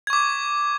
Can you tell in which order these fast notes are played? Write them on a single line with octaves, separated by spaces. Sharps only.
G#6 C#6 D6